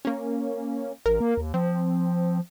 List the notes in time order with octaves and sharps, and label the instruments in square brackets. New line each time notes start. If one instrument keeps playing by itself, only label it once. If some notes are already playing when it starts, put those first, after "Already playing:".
[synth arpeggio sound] A#3 C#4
[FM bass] A1 [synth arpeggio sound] A#4
[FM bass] A#3
D#2
[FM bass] F3 [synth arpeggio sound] C4